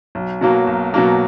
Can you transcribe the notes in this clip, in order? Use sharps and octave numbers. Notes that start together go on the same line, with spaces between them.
B1
B2 F#3 A#3
B1
B2 F#3 A#3